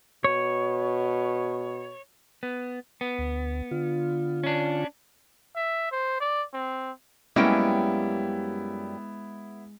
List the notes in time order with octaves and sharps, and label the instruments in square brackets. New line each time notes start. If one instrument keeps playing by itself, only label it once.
[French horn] B2 [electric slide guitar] C#5
[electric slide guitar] B3
B3
[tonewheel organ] D2
D3 F4
[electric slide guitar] C#4 D4
[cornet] E5
C5
D5
C4
[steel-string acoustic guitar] F#2 G3 [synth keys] G#3 [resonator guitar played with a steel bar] A#3 C#4 G5 [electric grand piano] B3 E4